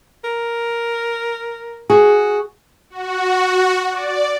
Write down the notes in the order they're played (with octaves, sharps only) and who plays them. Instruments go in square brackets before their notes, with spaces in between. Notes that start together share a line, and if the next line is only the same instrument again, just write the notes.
[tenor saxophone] A#4
[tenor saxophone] F#4 [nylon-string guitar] G#4
[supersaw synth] F#4
D5